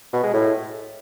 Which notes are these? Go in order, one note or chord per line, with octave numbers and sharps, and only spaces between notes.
B2
G#3
A2